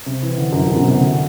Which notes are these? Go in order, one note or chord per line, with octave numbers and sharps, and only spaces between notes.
C3
E3
D3
F#2
F#2
B2
C3
D3